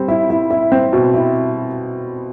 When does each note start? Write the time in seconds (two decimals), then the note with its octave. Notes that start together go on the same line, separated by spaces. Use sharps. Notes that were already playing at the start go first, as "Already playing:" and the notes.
Already playing: G3 C4
0.08 E4
0.30 E4
0.51 E4
0.72 C4
0.93 B2
1.14 E4